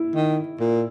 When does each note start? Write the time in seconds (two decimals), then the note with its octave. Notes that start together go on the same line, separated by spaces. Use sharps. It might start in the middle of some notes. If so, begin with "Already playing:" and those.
Already playing: E4
0.15 D#3
0.60 A#2